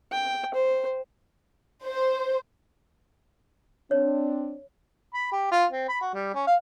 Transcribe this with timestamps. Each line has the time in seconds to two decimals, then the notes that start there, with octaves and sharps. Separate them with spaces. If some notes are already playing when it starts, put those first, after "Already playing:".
0.11 G5
0.54 C5
1.83 C5
3.91 C4 D4 C#5
5.14 B5
5.32 G4
5.51 F4
5.71 C4
5.89 B5
6.01 F#4
6.14 G3
6.34 C#4
6.47 F5